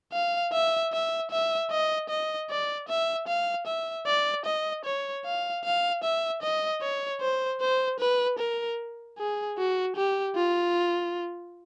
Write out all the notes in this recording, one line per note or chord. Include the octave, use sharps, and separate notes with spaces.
F5
E5
E5
E5
D#5
D#5
D5
E5
F5
E5
D5
D#5
C#5
F5
F5
E5
D#5
C#5
C5
C5
B4
A#4
G#4
F#4
G4
F4